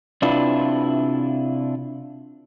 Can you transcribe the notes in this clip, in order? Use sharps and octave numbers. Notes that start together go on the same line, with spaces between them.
C3 D4 E4 F4 B4